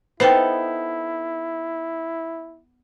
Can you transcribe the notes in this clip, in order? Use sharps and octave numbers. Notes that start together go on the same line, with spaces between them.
B3 D#4 E4 A4 C5 G5